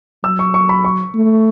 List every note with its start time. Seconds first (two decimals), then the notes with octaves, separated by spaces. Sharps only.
0.24 F#3 E6
0.39 C#6
0.54 C#6
0.69 B5
0.85 C#6
1.15 A3